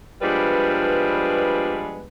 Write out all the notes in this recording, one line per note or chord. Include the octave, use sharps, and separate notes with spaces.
F3 G3 G#3 B3 D4 B4